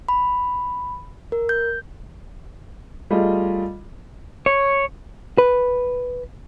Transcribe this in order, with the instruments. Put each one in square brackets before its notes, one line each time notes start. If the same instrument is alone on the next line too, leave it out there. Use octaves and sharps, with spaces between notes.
[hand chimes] B5
A#4
G6
[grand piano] G3 A3 F4 G#4 D#5
[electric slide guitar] C#5
[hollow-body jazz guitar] B4